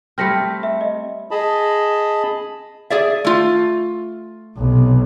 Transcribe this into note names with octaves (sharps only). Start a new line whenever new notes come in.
G3 A3 C4 F6 A#6 C#7
E5
D#5
G#4 D#5 A5 B5
G#4 D5 E5
A3 F4
B1 C3